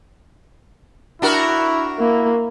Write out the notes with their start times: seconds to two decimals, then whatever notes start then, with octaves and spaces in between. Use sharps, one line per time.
1.22 D4 E4 F#4 A#4
1.99 A#3 E4